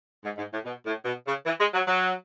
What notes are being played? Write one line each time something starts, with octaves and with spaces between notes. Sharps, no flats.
G#2
G#2
A2
B2
A2
B2
C#3
E3
G#3
F#3
F#3